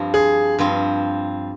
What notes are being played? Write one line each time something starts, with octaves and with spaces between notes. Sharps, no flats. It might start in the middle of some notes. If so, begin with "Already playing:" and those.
Already playing: G2 F3 C4
G#4
G2 F3 C4